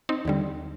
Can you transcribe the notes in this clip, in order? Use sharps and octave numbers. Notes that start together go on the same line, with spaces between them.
C4 D#4
D#2 D3 G3